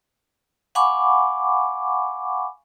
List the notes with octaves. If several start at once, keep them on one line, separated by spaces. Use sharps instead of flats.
F5 F#5 G#5 B5 C#6 D6